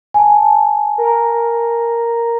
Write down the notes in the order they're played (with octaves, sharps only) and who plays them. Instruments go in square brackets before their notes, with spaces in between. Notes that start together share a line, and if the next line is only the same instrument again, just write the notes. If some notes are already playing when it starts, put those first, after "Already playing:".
[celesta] G#5 A5
[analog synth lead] A#4